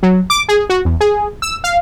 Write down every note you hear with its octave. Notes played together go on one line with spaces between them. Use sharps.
F#3
D6
G#4
F#4
E2
G#4
E6
F5